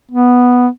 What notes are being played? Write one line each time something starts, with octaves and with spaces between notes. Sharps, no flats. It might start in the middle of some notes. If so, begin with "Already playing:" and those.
B3